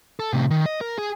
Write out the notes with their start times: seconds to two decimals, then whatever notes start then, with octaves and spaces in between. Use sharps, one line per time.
0.19 A4
0.33 A2 C3
0.50 D#3
0.66 D#5
0.81 A#4
0.98 G#4